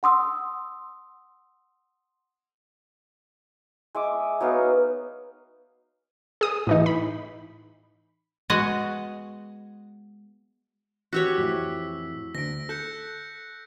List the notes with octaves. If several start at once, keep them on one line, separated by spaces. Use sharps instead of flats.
F#5 C6 D#6 E6
G#3 E5 D6
F#3 B3 D#4 F5
G#4 D#6
A2 E3 D#4
B5
G#3 B3 F#4 D#5
F#4 G4 C#5 E6 B6
F2 A2 E3
D2 D3 A#6 D7
A4 F#6 G6 C#7